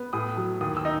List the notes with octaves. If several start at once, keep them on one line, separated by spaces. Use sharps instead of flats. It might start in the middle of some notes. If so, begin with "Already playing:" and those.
Already playing: B3
A2 D#6
F#3
D#2 D#6
E6
D#4